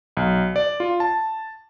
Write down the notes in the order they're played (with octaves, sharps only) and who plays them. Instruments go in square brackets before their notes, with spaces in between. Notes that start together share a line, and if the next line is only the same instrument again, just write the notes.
[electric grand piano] B1
D5
F4
A5